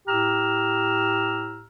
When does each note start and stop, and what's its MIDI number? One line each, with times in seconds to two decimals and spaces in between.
0.08 1.67 45
0.08 1.67 67
0.08 1.67 82
0.08 1.67 88
0.08 1.67 89